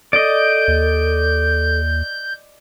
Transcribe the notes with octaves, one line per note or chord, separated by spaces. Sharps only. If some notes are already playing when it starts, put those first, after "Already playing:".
A4 D5 D#5 G6
D#2